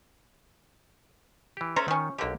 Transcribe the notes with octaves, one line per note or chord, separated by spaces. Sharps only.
E3 G4
A3 C#4 A4 C5 A#5
D#3 F3 C#4
B1 D3 A#3 G4